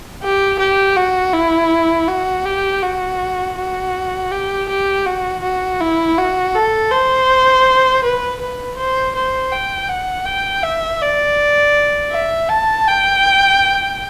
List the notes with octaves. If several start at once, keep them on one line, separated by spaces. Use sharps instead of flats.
G4
G4
F#4
E4
F#4
G4
F#4
F#4
G4
G4
F#4
F#4
E4
F#4
A4
C5
B4
B4
C5
C5
G5
F#5
G5
E5
D5
E5
A5
G5